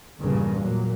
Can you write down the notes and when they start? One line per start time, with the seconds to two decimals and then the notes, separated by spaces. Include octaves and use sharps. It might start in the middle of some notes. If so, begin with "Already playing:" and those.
0.20 E2 G2 A#2 C#3
0.57 A#2 F#3